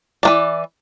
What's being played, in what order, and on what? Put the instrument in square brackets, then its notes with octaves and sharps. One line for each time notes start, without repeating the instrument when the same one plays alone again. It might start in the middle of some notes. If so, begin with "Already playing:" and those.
[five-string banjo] E3 A#3 D5